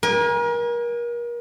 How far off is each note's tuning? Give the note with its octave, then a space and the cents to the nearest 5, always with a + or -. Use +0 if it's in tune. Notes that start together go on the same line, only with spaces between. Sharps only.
A#4 +35 G#5 -25